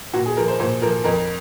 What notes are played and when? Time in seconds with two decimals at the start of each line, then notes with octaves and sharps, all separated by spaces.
0.14 A#2 F#4
0.26 G#4
0.37 F3 A#4
0.48 C5
0.59 A#2 C5
0.82 F3 A#4
1.04 F2 A#4